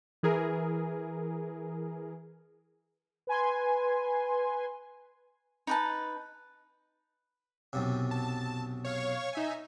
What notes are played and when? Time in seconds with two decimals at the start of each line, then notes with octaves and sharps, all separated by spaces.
0.23 E3 G#4 A#4
3.27 B4 G#5 C6
5.67 D#4 B4 A5
7.73 B1 F#2 C3
8.11 A5
8.85 C#5 F5 C#6
9.33 D#4 E5 G#5